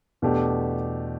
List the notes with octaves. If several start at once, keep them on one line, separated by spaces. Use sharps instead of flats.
E2 B2 A3 D4 G4